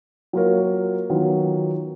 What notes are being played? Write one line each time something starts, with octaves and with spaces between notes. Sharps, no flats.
F#3 A#3 F4 A#4 C#5
D#3 F#3 B3 F4